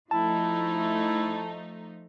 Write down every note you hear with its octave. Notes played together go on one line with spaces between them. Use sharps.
F3 A3 D#4 E4 A5